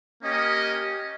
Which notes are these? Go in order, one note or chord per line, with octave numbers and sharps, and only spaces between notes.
A#3 C#4 G4 D#5